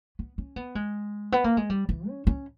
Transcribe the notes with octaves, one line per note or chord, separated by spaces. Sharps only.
B3
C#4
B3
G#3
B3
A#3
G#3
G3
E3
C#4
C#4